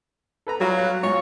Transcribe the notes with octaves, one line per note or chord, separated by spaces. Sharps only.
A4 B4 A#5
F#3 G3 F4 F#4
F5 F#6
G#2 F4 C#5 F5